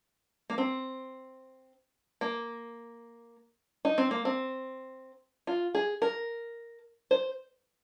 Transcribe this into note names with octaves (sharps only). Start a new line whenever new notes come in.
A#3
C4
A#3
D#4
C4
A#3
C4
F4
G#4
A#4
C5